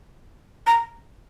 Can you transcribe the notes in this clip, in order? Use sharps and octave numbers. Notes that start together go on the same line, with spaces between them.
A#5